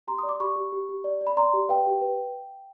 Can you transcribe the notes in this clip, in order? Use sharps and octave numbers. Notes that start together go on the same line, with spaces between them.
G4 A#5 C6
D5 D#6
D6
G4 B5 C#6
G4
G4
G4
D5
D5
B5
D5 A#5 C6
G4
B4 F5 G5
G4
B4